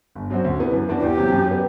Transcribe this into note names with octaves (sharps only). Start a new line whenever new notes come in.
G1
F#2 F#3 C4 F#4
D2
C3 E3 B3
F#2
E3 B3 D4 F#4
E2 G4
C3 F#3
F#2
F#3 B3